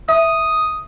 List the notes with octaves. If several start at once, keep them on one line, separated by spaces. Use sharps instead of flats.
E5 D#6